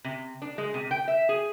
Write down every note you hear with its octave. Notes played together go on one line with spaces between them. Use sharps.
C3
D4
G#3
C3
G5
E5
G#4